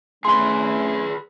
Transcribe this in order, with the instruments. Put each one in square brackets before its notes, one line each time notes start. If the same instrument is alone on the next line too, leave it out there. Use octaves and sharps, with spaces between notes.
[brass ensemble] A3 C#4 E4 [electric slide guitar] G#4 B4 [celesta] C6